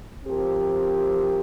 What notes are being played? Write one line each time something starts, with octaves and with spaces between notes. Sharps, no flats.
F3 C4 G4 A#4